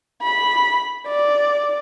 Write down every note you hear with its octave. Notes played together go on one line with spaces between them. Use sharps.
B5
D5